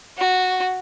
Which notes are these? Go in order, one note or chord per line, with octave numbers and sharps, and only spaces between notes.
F#4